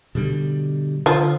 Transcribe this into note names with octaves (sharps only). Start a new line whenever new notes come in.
B2 D3 G3
D3 F3